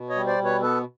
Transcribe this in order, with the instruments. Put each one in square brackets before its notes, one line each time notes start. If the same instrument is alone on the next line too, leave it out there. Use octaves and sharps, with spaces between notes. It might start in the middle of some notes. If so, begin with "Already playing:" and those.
Already playing: [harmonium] B2
C#5 D#5
G3
C5 D5
B2
B4 C#5
B3 A4 B4